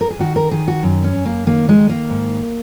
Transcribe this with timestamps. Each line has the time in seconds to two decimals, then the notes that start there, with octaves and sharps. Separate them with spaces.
0.01 A#4
0.10 G#4
0.19 D#3 F#4
0.36 A#4
0.51 D#3 G#4
0.68 F#4
0.83 F#2
1.04 C#4
1.15 F#2
1.26 A#3
1.47 D#3 A#3
1.69 G#3
1.78 D#3
1.89 A#3
2.10 G#2